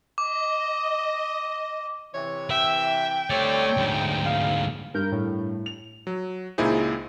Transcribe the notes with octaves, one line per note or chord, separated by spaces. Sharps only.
D#5 D6
C3 E3 C#5
E5 G5
G3 A3 C4 C#5 D5
D2 G#2
F5
G2 A#4 G6
A2
F7
F#3
C#2 A#2 D#4 E4 G#4 C5